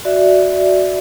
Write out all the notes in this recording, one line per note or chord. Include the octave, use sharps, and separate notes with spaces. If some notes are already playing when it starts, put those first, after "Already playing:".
F#4 D5 E5